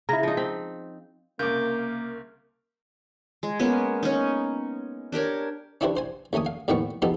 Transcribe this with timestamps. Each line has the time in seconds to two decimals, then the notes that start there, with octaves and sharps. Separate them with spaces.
0.09 C#3 E4 A#5
0.23 F3 D#4
0.37 C4 B6
1.39 C2 C#3 A#3 A#4 D6 G6
3.43 G#3
3.59 G#3 A#3 B3 C#4
4.03 C#4 D#4
5.12 D4 G4 A#4 C#5
5.81 C#4 D4 E4 G4 B4 C5
5.97 C5 G#5
6.33 D#2 A3 C#4 G#5 D#6
6.46 F5
6.68 D#2 A2 D#3 B3 C4 C#6
7.02 F3 B3 D#4 G4 A4